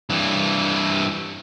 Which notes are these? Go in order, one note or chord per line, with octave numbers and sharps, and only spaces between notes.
G2 E3